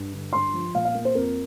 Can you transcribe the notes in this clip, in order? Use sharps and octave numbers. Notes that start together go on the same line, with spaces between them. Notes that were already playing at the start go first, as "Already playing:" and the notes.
Already playing: G2
D3
G2 C6
F3
A#2 F5
F5
A#3
C5
F2 A#4